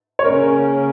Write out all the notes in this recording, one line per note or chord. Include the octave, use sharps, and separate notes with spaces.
C#5
C#3 A#3 C#4 A#4